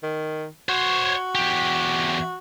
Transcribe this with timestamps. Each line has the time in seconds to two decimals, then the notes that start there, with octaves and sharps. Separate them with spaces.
0.03 D#3
0.69 F#4 C5 C#5
1.35 E2 G4